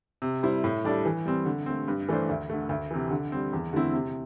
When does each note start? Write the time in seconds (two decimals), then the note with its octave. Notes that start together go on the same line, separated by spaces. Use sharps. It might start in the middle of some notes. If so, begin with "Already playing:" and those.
0.22 C3
0.43 G3 E4 C5
0.64 A2
0.85 G3 D4 A4 D5
1.05 E3
1.26 G3 C4
1.46 D3
1.66 A3 C4
1.88 G2
2.09 E3 A3 D4 C5
2.29 D2
2.50 D3 A3
2.69 D2
2.91 C3 E3
3.11 D3
3.32 G3 C4
3.53 E2
3.73 D3 A3 C4 E4
3.93 C3